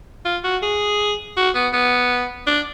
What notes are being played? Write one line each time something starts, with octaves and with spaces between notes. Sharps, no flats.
F4
F#4
G#4
F#4
B3
B3
D4